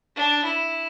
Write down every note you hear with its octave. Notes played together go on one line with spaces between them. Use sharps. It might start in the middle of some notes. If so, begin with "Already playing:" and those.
D4
E4